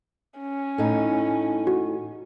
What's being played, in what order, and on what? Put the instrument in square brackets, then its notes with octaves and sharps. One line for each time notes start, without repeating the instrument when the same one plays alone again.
[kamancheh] C#4
[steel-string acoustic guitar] A2 D#4
[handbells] F#4